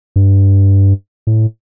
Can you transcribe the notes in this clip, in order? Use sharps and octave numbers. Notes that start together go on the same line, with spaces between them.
G2
A2